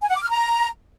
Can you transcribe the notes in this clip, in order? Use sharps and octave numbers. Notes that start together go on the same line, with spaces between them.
G#5
F#5
D6
F6
A#5